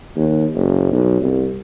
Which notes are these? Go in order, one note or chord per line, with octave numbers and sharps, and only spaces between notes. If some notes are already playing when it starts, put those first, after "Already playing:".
D#2
F#1
B1
C2